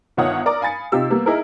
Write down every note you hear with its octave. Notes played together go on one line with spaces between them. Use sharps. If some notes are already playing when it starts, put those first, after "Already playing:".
G1 D#3 F4 C#5 F#5 D#6
A#4 D5 A#5 D6
F5 G#5 B5 A6 C#7
C3 D#4 F4 G4 E6
G3 A#3 B3
D#4 E4 G#4 A#4